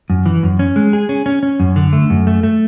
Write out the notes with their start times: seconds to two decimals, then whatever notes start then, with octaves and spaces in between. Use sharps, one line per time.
0.10 F#2
0.26 E3
0.43 F#2
0.59 C#4
0.76 G#3
0.93 G#4
1.09 C#4
1.26 C#4
1.43 C#4
1.60 F#2
1.76 D3
1.93 A3
2.10 F#2
2.27 A3
2.43 A3